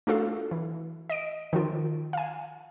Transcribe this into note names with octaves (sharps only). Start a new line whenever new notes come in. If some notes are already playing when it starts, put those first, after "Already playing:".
A3 D4 F4 F#4 A4 F5
E3
D#5 D7
D#3 F3 F4
F5 G#5